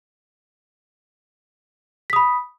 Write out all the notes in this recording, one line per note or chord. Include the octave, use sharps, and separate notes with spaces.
B5 D#6 B6